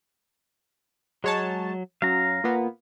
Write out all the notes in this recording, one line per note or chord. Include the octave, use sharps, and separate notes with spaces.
F#3 G#3 C#5 A5
F#2 F#3 F5 A#5
A#2 A#3 B3